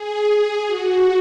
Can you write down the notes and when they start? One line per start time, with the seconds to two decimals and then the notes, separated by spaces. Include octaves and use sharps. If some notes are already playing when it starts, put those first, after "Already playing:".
Already playing: G#4
0.66 F#4